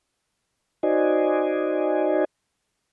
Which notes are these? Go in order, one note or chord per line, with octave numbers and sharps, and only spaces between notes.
D#4 F#4 C5 D5 D#5 G#5